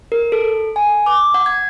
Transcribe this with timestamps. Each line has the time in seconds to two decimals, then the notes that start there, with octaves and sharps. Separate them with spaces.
0.12 A#4
0.32 A4
0.76 G#5
1.06 D6
1.34 F#5
1.46 G#6